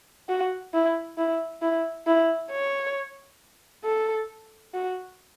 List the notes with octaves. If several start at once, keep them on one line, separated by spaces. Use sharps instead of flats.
F#4
E4
E4
E4
E4
C#5
A4
F#4